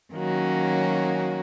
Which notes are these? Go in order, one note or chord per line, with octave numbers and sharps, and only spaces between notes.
D#3 F#3 A#3 C#4 F#4